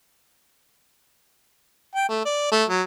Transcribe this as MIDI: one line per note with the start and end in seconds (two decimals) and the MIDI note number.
1.95 2.08 79
2.09 2.24 57
2.25 2.50 74
2.51 2.64 57
2.69 2.82 54